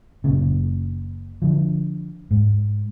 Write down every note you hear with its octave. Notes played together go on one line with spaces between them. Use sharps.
F#1 A#2 C#3
D3 F3
G#2